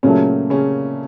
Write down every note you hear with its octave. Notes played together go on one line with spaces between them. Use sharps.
A#2 C#3 F#3 A3 C#4
C#3 C#4